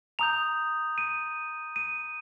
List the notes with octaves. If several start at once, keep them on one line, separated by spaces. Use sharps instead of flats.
A#5 D#6 G6 F7
D#7
D#7